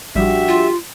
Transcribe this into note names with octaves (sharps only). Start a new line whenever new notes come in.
A1 F3 G3 D4 F#4 G4 E5
F4